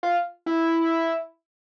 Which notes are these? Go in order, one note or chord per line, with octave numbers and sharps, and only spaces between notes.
F4
E4